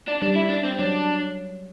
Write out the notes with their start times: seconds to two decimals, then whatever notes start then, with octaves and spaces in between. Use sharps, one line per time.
0.08 D4
0.22 G3 D4
0.36 E4
0.50 D4
0.65 C4
0.79 F#3 D4